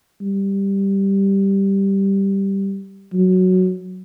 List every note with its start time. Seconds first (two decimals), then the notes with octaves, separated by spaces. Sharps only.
0.21 G3
3.13 F#3